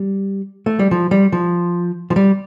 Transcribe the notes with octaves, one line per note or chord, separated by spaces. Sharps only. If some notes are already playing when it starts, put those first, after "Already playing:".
Already playing: G3
A3
G3
F3
G3
F3
F3
G3